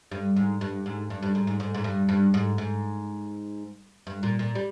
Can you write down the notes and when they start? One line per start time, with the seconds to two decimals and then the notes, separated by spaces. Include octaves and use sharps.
0.11 G2
0.36 G#2
0.61 G2
0.86 G#2
1.10 G2
1.23 G2
1.35 G#2
1.47 G#2
1.60 G#2
1.75 G#2
1.84 G2
2.09 G2
2.34 G#2
2.58 G#2
4.07 G2
4.23 A#2
4.39 A#2
4.55 G3